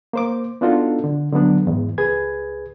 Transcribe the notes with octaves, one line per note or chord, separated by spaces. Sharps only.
A#3 C5 D6
B3 D4 D#4 F4 F#4 A4
D3
D3 F#3 B3 D4
E2 G#2
C#2 G#4 B4 G#6